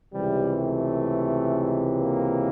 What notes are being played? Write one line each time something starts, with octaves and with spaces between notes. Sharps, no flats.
C#2 C3 E3 G3
A3
A#3